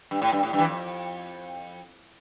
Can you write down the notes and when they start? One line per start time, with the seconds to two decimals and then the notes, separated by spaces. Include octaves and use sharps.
0.11 G2
0.21 A2
0.32 G2
0.43 A2
0.53 G2
0.59 E3
0.64 F2